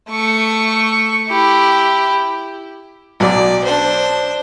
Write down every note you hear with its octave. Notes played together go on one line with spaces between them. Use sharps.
A3 C#6
E4 G4
B1 F#3 D5 D6
D4 C5